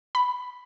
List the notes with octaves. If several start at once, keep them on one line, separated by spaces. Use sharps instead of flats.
B5